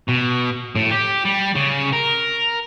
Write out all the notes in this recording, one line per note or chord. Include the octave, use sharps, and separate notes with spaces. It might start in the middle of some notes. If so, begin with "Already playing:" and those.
B2
A2
G4
G3
C#3
A#4